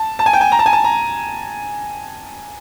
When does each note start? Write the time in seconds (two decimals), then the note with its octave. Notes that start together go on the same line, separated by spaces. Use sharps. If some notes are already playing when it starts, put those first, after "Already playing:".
Already playing: A5
0.19 A5
0.26 G#5
0.33 G5
0.41 G#5
0.52 A#5
0.59 A5
0.66 G#5
0.73 A5
0.84 A#5